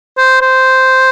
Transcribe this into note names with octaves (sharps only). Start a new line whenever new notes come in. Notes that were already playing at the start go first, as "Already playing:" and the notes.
C5
C5